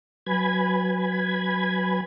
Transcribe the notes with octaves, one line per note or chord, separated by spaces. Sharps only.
F#3 B4 G#5 B5 G#6